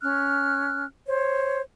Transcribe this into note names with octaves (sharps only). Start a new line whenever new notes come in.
C#4 F6 F#6
C5 C#5